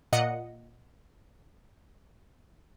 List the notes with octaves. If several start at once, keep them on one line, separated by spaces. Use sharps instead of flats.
A#2 D#5 F#5 C#7